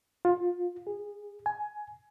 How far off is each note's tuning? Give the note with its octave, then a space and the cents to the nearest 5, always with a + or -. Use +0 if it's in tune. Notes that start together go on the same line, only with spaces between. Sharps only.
F4 +20
G#4 -20
G#5 +15